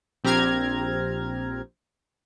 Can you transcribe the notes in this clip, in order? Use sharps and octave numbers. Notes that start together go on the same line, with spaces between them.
A#1 C4 G4 A#5 F6 G#6